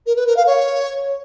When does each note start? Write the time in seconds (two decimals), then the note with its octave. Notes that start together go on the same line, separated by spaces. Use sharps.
0.06 A#4
0.16 B4
0.27 A#4
0.37 F5
0.47 C#5